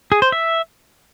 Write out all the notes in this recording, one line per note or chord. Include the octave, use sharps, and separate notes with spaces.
G#4
C5
E5